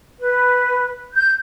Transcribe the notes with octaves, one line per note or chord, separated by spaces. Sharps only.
B4
G6